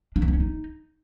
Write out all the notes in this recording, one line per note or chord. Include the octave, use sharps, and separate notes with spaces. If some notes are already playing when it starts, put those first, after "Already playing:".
D4
D#3
B3
C#4
D#4